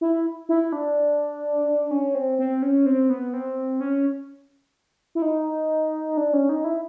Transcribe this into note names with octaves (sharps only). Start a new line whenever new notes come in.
E4
E4
D4
C#4
C4
C4
C#4
C4
B3
C4
C#4
E4
D#4
D4
C#4
D#4
E4